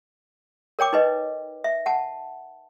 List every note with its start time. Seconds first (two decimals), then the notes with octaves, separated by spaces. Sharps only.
0.79 A#4 C#5 G5 D6
0.93 D#4 B4 D#5
1.64 E5
1.86 F#5 A5